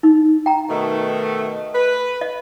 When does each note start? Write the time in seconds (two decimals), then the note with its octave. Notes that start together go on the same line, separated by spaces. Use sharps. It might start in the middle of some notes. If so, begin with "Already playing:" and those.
0.03 D#4
0.46 G5 A#5
0.70 B2 D#3 A3
1.75 B4
2.21 D#5